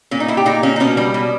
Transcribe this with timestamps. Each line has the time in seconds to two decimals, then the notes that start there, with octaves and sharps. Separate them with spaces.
0.11 A#2 C#4
0.20 D#4
0.28 A#2 E4
0.37 G4
0.46 A#2 D#4
0.63 A#2 C#4
0.76 D#4
0.80 B2 C#4
0.97 G3
1.14 B2